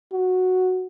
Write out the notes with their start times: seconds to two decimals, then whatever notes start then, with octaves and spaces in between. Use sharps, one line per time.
0.12 F#4